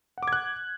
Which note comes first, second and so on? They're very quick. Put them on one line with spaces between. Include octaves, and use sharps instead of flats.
F#5 D6 G#6 F#6